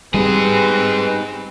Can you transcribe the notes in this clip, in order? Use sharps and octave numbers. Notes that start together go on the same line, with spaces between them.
G3 C4 D#4 G#4 B4